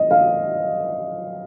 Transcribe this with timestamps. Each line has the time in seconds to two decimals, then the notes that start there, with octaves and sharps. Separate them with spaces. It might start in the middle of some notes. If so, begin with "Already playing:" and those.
Already playing: D#5
0.11 F5